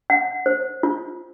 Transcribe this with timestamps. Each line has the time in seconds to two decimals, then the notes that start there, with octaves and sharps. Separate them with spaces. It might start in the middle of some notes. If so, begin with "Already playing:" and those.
0.10 F#5
0.46 C5
0.83 F4